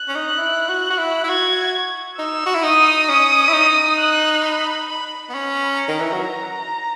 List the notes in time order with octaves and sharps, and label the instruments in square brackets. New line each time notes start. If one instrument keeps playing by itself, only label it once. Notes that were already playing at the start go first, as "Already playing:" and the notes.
Already playing: [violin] F#6
[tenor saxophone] C#4
D#4
E4
F#4
F#4
E4
E4
[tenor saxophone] F#4 [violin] G#6
[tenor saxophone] D#4 [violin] E6
[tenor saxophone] F#4
E4
[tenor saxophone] D#4 [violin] D#6
[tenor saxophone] C#4 [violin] D#6
[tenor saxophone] E4
D#4
[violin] F#6
B5
B5
[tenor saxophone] B3
[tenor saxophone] C#4 [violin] B5
[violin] A#5
[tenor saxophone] D#3
E3
F#3